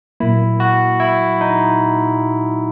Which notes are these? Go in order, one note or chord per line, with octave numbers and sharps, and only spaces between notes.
A#2 F#3 A#3 E4
F#4
E4
D#4